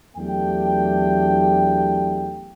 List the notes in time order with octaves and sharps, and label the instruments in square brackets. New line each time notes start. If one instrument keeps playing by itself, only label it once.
[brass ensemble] E2 F#3 A3 D4 G4 G5